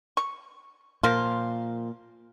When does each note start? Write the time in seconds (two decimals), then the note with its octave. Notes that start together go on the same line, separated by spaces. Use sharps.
0.17 C#6
1.03 A#2 F3 A#3 F4